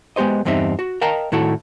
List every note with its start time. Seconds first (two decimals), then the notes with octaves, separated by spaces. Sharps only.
0.16 G#3 B3 G4 C5 D#5
0.45 E2 G2 C4 D#4 E5
0.79 F#4
1.01 A#4 D#5 F5 G5 A5 A#5
1.32 A2 D#3 E4 F#4 A4